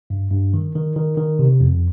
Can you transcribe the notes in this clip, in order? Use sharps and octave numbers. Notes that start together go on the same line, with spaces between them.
G2
G2
D#3
D#3
D#3
D#3
C3
F2